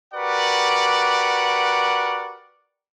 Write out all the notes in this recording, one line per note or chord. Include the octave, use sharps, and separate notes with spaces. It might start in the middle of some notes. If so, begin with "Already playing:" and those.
F#4 G4 A#4 B4 D5 F#5